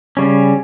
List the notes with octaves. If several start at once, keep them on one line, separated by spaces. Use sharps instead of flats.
C#3 G3 C#4